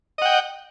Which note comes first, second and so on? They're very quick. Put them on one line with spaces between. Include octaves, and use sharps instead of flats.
D#5 F#5 G5